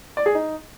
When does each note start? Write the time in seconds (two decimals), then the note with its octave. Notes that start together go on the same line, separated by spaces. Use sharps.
0.17 D5
0.26 G#4
0.35 D#4